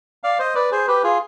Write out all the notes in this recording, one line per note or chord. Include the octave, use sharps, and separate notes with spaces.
D5 F5
C5 D#5
B4 D5
G#4 C5
G4 B4
F4 G#4